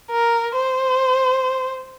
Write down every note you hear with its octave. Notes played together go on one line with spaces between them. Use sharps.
A#4
C5